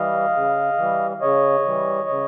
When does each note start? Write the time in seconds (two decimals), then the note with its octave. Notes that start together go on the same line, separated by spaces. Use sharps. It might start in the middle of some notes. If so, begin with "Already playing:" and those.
Already playing: E3 G3 D#5 F5
0.35 C#3
0.78 E3 G3
1.21 C#3 C#5 D#5
1.65 E3 G3
2.09 C#3